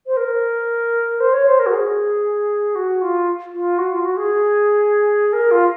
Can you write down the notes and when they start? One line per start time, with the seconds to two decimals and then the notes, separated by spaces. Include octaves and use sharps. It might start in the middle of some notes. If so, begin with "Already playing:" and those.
0.07 C5
0.17 A#4
1.20 C5
1.33 C#5
1.46 C5
1.59 A#4
1.66 F#4
1.72 G#4
2.75 F#4
3.02 F4
3.52 F4
3.78 F#4
3.92 F4
4.05 F#4
4.17 G#4
5.33 A#4
5.51 F4